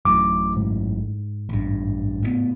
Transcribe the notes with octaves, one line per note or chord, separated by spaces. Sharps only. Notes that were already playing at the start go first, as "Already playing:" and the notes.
A1 F#2 A2 D6
G#2
A1 G2
A2 C3 B3